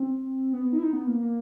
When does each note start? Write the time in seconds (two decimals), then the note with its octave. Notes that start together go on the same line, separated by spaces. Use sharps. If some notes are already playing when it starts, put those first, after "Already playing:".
Already playing: C4
0.53 B3
0.73 D#4
0.78 E4
0.83 D#4
0.93 B3
1.07 A#3
1.21 A#3